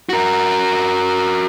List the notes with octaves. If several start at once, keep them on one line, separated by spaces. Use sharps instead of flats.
F#4 A#4